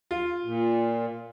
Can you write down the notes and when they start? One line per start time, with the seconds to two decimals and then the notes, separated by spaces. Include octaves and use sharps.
0.11 F4
0.44 A#2